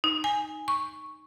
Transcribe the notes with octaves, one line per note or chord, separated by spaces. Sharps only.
D#4
G#5
C#6